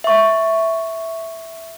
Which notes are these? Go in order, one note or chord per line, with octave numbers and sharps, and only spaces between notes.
E5 C#6